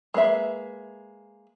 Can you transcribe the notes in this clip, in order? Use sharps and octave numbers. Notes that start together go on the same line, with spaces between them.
G#3 A#3 B4 E5